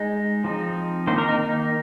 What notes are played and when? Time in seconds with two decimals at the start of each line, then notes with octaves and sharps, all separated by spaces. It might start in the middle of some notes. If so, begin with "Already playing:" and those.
Already playing: G#3 D#4
0.44 F3 C4 D#4
1.07 D#3 A#3 D#4 C5
1.18 A#4
1.29 D#4
1.39 D#4